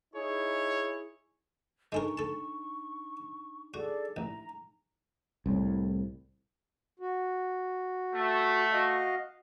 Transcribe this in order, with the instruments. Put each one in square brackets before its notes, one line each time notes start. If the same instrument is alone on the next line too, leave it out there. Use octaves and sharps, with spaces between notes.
[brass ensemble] D#4 E4 G#4 C#5
[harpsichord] G#3 A4 A#4 [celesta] D4 D#4 G#5 [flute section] C#6
[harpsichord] A4 A5
[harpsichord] F#4 [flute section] G#4 A4 D5
[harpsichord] A1 [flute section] A#5
[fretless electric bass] C2 A2
[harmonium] F#4
[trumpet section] A3
[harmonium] F#4 D#5 F5